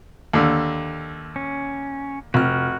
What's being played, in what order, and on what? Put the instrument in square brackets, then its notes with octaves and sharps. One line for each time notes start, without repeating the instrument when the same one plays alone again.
[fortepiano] D#2 D3
[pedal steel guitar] C#4
[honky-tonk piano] F1 F6 [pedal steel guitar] F#4